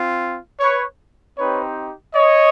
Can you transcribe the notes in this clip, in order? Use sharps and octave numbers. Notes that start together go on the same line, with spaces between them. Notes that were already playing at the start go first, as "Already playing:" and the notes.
Already playing: C4 F4
B4 C#5
C4 D#4 G4 B4 C#5
C#5 D#5